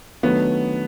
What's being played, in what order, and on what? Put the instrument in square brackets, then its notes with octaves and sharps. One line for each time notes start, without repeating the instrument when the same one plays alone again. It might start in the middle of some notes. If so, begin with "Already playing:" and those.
[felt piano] D#3 F#3 A3 D4 [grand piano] B3